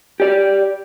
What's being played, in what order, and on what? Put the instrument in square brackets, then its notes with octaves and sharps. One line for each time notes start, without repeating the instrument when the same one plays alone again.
[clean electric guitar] G4 D5